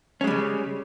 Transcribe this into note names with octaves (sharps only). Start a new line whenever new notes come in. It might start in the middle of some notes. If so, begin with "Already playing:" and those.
C#3 G3 G#3 C#4